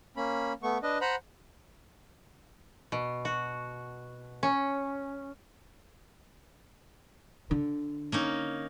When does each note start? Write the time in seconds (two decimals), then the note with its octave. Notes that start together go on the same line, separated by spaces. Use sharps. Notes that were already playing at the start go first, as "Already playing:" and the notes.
0.17 A#3 C#4 B5
0.63 A3 B3 C#6
0.83 D4 B4 D#5
1.01 C5 F#5 A#5 B5 F#6
2.92 B2
3.25 F#4
4.43 C#4
7.51 D3
8.12 A#3 C#4 D#4